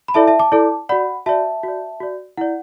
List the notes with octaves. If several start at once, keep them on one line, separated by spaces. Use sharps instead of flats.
B5
E4 A4 D5 E5 A5
E5 A5
A5 D6
E4 A4 D5
F#4 D5 F#5 B5
F#4 D5 E5 A5
F#4 D5
F#4 D5
E4 D5 F#5